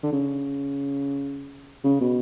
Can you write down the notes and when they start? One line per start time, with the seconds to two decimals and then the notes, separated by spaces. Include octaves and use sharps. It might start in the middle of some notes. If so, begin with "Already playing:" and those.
0.03 D3
0.13 C#3
1.84 C#3
2.01 B2